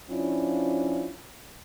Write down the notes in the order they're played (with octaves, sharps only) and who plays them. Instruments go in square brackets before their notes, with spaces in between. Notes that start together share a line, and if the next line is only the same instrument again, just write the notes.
[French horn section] F3 C#4 D4 E4 F4